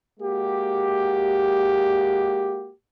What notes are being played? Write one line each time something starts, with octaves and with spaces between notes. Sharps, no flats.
G#3 A#3 F#4 G4